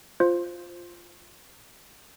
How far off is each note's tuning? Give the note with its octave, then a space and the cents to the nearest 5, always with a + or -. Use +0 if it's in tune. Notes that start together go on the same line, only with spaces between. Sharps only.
F4 +0 C5 +0